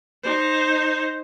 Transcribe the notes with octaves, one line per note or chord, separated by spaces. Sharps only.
D#4 C5